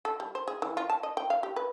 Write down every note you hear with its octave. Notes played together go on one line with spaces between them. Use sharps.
A4
G3
C5
G#4
E3
F4
A5
D#5
G5
F5
G4
B4